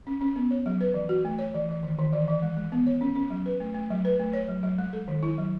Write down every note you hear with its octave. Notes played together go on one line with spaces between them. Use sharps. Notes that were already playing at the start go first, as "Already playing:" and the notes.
C#4
C#4
B3
C#5
F#3
B4
E3
F#4
A3
C#5
E3
E3
D#3
D#3
E3
E3
G#3
G#3
B3
C#5
C#4
C#4
F#3
B4
A3
A3
F#3
B4
A3
C#5
F#3
F#3
G#3
A4
D#3
E4
F#3